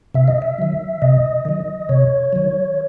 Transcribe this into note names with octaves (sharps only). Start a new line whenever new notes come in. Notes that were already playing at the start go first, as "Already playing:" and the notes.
C3 E5
D#5
E5
D#3 F#3
C3 D#5
D#3 F#3
C3 C#5
D#3 F#3